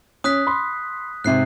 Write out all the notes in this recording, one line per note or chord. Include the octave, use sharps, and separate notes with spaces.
C#4 D#6 F#6 B6
B5 C6
G#2 C3 F#6 C7